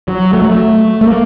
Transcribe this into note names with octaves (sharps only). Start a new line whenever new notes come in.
F#3
A3
F#3
A3
A3
A#3